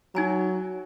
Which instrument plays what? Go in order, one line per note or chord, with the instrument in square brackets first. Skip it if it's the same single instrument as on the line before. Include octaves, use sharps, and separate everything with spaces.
[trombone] F#3 [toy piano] D#4 G#5 A#5